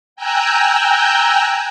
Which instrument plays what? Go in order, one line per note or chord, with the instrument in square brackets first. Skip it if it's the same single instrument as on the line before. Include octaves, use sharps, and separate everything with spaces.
[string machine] G5 G#5 A#5 E6 F#6 G6